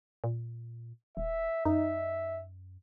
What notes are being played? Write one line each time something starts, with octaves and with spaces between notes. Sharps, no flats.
A#2
D#1 E5
F#2 D#4 E5